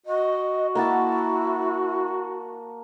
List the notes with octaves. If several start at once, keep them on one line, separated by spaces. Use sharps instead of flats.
F#4 D#5
A#3 E4 F#5 A5